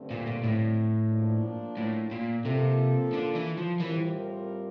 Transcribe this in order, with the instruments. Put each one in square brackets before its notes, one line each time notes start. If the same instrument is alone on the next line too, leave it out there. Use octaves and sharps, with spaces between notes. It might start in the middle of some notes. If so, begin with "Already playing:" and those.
Already playing: [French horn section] G2 D3 A3 C4
[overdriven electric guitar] A#2
A#2
A2
[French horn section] F3 A#3 D4
[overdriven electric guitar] A2
A#2
[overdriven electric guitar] C3 [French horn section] F3 A#3 F4 A4
[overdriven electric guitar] D3
E3
F3
[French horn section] A2 G3 C4 F4 A#4 [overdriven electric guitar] E3